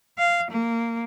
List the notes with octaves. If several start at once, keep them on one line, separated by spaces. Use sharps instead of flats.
F5
A#3